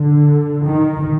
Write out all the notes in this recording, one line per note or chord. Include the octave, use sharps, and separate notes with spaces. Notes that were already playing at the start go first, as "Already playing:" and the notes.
Already playing: D3
D#3